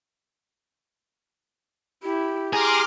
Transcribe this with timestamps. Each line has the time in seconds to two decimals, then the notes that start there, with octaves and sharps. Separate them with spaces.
2.03 E4 G4
2.53 G#4 A#5 C6 D6 F6